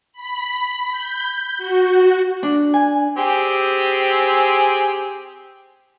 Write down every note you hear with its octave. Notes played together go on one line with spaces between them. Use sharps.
B5
G6
F#4
D4
G#5
C4 G4 G#4